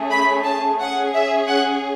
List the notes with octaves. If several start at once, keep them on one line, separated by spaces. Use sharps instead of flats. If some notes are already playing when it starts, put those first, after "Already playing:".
Already playing: A3 C#4 G#4
B5
A5
C#4 G#4 F#5
E5
F#5